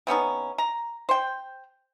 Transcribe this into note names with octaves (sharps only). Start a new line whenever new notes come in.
C3 B3 C#4 D#4
A#5
C5 G5